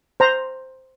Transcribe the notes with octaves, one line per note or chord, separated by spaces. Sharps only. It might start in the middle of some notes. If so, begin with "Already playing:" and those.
C5 A#5